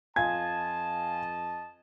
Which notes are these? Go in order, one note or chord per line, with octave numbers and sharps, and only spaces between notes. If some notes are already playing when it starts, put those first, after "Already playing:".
F2 F4 D#5 G#5 A5 G#6